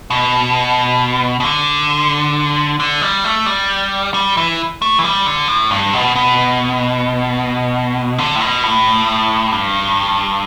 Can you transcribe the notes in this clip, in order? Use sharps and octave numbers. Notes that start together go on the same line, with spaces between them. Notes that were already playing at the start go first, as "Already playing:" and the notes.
B2
B2
D3
D3
G3
A3
G3
G3
E3
A3
E3
G3
D3
A2
G2
B2
B2
D3
A2
B2
A2
G2